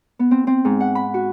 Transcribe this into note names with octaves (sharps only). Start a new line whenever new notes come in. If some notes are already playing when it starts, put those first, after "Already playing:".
B3
C4
C4
G#2
F#5
B5
F#4